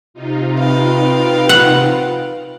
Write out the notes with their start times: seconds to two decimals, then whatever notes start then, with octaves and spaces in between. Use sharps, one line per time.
0.14 C3 D#4 F4
0.57 B4 F5 G5
1.49 F#5